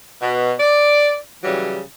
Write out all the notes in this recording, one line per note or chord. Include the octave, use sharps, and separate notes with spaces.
B2
D5
C#3 E3 F#3 G3